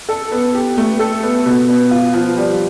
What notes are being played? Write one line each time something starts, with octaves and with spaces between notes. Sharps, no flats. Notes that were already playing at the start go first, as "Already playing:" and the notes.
A4
B3
G4
A3
A4
B3
B2
B3
F4
F3
G3